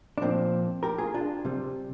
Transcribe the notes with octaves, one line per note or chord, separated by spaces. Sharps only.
D4
A#2 F3 C4
G4 A#4
F4 G#4
D4 F4
C3 G3